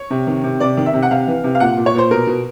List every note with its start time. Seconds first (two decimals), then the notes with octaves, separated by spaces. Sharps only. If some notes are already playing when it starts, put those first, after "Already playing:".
Already playing: C#5
0.10 C3
0.27 D#3
0.44 C3
0.60 C3 D5
0.77 D#3
0.86 E5
0.94 C3
1.03 F#5
1.11 C3 F5
1.28 E3
1.44 C3
1.55 F5
1.60 A#2 F#5
1.77 A#2
1.86 C#5
1.94 A#2 C5
2.10 B2 A#4
2.27 B2